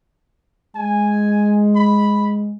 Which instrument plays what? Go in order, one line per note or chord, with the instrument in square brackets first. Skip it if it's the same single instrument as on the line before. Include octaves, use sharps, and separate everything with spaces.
[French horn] G#3 [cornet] G#5
[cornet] B5